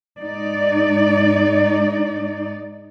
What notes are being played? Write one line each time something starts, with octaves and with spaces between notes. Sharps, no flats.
G#2 D#4 D5